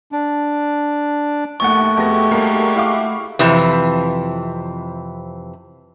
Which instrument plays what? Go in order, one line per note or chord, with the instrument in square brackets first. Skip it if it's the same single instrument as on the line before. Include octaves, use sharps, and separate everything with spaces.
[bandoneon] D4
[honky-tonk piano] A#1 D#2 F#5 [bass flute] A3 [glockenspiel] C#6
[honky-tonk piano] F2 B3 A#6 [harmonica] G#3 F#4 G4
[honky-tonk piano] D#2 G3 A#3
E4 F5 D6
[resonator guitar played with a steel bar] F2 C3 E3